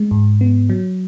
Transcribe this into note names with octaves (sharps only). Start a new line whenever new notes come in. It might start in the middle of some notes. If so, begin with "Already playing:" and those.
Already playing: G#3
G#2
B3
F#3